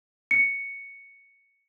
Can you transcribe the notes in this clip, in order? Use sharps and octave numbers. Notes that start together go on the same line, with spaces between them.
C#7